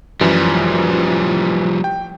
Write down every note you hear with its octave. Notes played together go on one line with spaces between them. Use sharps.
F#2 E3 F3 G3
G5